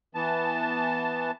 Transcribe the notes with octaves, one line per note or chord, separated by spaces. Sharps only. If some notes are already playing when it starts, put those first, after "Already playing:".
E3 B3 A5